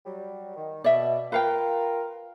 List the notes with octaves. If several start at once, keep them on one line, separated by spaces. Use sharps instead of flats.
F#3 G3
D#3
B2 D5 E5
F4 A#4 B4 F5 G5